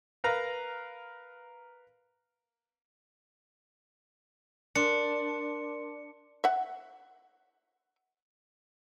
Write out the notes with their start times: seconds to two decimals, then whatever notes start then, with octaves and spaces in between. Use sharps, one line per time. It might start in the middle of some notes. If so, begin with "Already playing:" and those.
0.24 A#4 B4 F5 A#5
4.75 D4 A#4 C6 C#7
6.44 E5 F#5